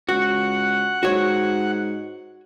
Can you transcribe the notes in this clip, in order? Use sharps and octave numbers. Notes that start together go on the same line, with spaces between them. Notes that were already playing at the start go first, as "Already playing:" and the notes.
C#2 F#4 F#5 F#6
G#2 F#4 C#5